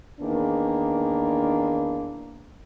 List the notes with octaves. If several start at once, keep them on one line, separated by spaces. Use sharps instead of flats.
E2 D#3 A#3 D4